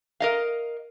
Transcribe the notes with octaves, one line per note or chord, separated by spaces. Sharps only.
A#4 D#5 F5